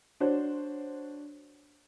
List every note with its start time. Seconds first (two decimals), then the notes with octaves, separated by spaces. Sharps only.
0.20 D4 F#4 C5 C#5